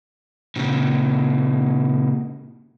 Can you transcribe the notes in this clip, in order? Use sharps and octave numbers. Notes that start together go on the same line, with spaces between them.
A#2 C#3